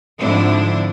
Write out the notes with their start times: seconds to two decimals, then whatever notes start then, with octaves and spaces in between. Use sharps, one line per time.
0.19 G#2 D3 F3 C4 D4 E4